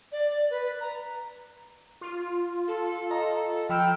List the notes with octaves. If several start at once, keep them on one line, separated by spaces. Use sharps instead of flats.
D5
B4
A#5
F4
A4
D#5 A#5
F3 G5 B5 E6 F6